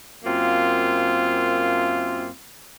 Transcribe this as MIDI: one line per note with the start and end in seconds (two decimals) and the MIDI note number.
0.24 2.29 42
0.24 2.29 58
0.24 2.29 60
0.24 2.29 65